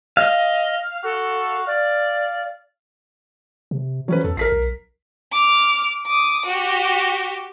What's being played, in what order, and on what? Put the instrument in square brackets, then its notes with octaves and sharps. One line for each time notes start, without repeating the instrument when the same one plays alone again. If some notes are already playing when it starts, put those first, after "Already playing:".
[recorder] D#5 [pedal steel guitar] F5
[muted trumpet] F#4 [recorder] A4
[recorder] D5 [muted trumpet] F5
[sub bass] C3
[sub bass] E3 [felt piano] F#3 C#4 B4
[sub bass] E2 [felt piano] A4
[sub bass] G#1 [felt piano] A#4 B6 C7
[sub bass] B1
[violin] D6 F6
D6 D#6
F#4 G4